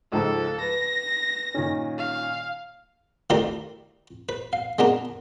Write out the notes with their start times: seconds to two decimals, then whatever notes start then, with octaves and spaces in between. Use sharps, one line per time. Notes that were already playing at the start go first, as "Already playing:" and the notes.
0.12 C#2 G#2 F3 A4
0.60 B4 A#6
1.54 A#2 D#3 C#4
1.98 F5
3.30 D#3 A3 E4 G4 A#4 D5
4.29 B4
4.53 F5
4.79 G#3 B3 D4 A#4